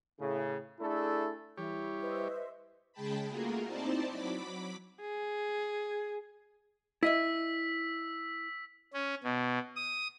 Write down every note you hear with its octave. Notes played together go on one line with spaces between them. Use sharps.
A2 C#3
A3 D4 E4 G#4 A4
E3 G3 E4 G4 C#5
B4 C5 D#5 E5
C#3 G#3 G#4 G5 A5 B5
A3 A#3 F4 F#4 G#4 A#4
C4 D#4 E4 C5 D5 A5
F#3 B5 D6 B6
G#4
E4 D#5 E5 E6 B6
C#4
B2
D#6